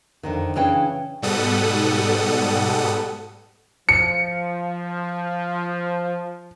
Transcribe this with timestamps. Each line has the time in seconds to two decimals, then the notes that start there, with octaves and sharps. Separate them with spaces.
0.23 F2 D3 D#3
0.56 C#3 E3 C#4 D4 B4 G5
1.22 G#2 B2 G3 A4 F#5 D#6
3.89 F3 C#7